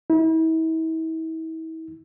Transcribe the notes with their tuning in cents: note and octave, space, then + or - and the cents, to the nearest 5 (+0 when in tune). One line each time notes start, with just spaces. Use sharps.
E4 -40